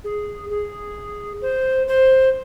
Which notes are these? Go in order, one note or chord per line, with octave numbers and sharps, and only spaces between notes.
G#4
G#4
C5
C5